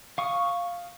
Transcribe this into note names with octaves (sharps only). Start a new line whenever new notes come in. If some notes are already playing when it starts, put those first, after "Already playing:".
F5 C#6 D#6